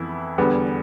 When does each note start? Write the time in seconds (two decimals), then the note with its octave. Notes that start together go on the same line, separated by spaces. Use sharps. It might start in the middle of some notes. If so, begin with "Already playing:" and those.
Already playing: F2 E3 B3 E4
0.38 E2 D3 G3 B3